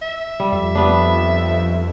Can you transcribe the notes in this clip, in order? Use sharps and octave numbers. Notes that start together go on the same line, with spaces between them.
E5
G3
F2 E5
G3 B3 D4